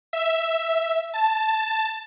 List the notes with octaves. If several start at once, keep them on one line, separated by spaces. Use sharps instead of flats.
E5
A5